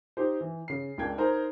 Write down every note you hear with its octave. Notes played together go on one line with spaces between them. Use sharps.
D#4 G4 C5
E3
C#3 C7
C#2 D4 A#4 G5 G#6
D#4 A#4 C5 A#5